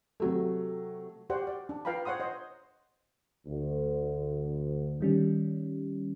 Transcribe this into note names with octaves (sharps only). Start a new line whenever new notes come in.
C3 F#3 A3
F#4 G4 C5 D5 F#5
D5
D4
F4 B4 F5 G5 A#5 B5
C5 C#5 F#5 C6 D#6
C5 D#5
D2
D#3 G3 C#4